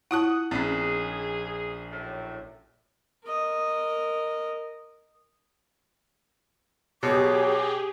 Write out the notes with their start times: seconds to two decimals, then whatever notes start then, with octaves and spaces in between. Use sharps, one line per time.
0.11 E4 F4 F#5 A5 D#6 F#6
0.51 A#1 C4 C#4 G#4
1.91 F#2 A2
3.25 A#4 D#5
7.03 B2 F#3 G4 G#4 D6